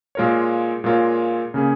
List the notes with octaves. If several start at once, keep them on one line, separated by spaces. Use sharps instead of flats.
A#2 G#3 F4 A#4 C#5
A#2 G#3 F4 A#4 C#5
C#3 A#3 C#4 G#4